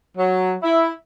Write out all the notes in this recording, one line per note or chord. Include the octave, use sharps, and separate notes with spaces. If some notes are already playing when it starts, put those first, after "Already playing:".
F#3
E4